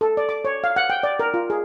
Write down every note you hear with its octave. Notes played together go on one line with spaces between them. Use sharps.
A4
D5
D6
C#5
F5
F#5
G5
D5
A#4
F4
G#4